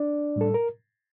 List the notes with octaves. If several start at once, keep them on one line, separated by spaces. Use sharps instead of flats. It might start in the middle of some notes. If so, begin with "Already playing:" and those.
Already playing: D4 D5
A2 G3 A4
A#4